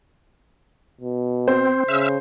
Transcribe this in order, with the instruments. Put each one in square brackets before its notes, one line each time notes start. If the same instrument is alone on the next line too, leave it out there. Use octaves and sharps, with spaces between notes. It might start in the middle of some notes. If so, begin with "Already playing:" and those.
[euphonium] B2
[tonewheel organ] C4 [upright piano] C5
[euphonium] C#3 [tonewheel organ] E5 E6 F6